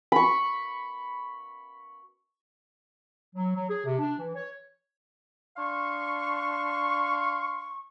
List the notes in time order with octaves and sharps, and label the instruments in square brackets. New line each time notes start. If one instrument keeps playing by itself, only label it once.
[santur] B5 C#6
[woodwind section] F#3
F#3
G#4
C3
D4
E3
C#5
D4 F5 C6 C#6